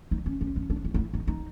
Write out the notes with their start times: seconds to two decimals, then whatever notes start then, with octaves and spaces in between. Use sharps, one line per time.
0.11 D#4
0.26 C#4
0.41 C#4
0.56 C#4
0.70 D4
0.85 E4
0.94 D#4
0.99 E4
1.14 D#4
1.28 D#4